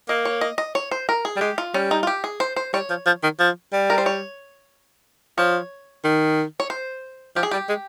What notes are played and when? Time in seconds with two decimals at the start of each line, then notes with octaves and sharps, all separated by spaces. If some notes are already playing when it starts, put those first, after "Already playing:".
0.09 A#3 D#5
0.25 C#5
0.41 D#5
0.58 D#5
0.75 C#5
0.91 C5
1.09 A#4
1.25 G#4
1.36 G3
1.41 G#3 G4
1.58 F4
1.74 G3 C#4
1.91 D#4
2.03 F4
2.07 G4
2.24 G#4
2.40 C5
2.56 C5
2.74 G3 C#5
2.90 F3
3.06 F3
3.23 D#3
3.40 F3
3.73 G3
3.90 A#4
3.98 C5
4.06 C#5
5.38 F3 C#5
6.04 D#3
6.60 C#5
6.70 C5
7.36 F3 G4
7.43 G#4
7.51 G3 G4
7.69 G#3